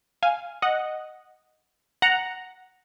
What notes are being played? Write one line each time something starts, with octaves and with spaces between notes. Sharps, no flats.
F5 G#5
D#5 F#5
F#5 A#5